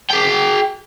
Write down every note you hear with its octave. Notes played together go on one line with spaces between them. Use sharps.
G#4 G5